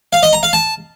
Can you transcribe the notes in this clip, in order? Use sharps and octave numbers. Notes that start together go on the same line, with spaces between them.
F5
D#5
A#5
F5
A5